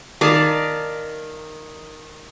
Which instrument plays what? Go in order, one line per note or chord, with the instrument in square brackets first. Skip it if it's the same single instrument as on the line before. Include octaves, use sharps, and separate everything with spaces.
[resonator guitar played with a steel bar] D#3 [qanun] D5 F5 A5